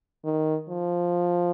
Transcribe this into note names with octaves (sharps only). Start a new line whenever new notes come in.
D#3
F3